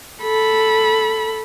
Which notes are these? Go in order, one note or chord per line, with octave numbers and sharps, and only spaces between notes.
A4 B5